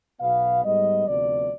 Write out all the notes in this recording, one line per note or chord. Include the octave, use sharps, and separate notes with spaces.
B1 B2 B3 F5
G#2 G3 B3 D#5
D2 C3 F3 B3 D5